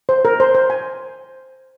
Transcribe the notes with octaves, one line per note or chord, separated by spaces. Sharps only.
C5
A#4
C5
C5
G#5